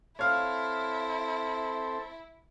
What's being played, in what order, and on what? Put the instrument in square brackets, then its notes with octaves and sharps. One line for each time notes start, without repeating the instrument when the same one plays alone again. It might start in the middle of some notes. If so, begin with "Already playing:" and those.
[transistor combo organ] C4 A4 [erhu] E4 [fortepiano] C#5 F5